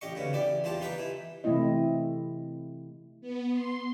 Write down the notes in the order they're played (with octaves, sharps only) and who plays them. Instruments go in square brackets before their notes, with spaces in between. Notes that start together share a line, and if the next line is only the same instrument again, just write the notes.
[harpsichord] A1 G4 D#5 C#6
D2 C#3 B3
A1 E4 G4 D5
E2 F3 G4 C5 A5
D#4 G4 B4 G5 B5
E3 E4
[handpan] C3 E3 A3 C4 E4 D#5
[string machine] B3
C6